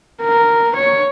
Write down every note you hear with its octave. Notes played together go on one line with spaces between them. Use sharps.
A#4
C#5